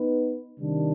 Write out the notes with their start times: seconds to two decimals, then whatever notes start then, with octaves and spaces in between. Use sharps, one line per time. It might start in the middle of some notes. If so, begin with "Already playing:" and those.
Already playing: B3 D#4 B4
0.59 C3 D#3 G3 D4